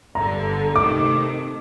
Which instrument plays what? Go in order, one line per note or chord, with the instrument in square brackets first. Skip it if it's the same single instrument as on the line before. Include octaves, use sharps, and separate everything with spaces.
[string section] G1 G2 D3 [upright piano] A#5
[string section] C3 D#3 A3 [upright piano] D6